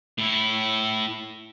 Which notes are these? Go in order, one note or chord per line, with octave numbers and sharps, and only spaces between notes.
A2 E4